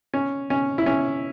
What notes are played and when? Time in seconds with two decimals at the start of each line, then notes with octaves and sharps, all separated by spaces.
0.14 C#4
0.50 C#4
0.78 E4
0.86 C#4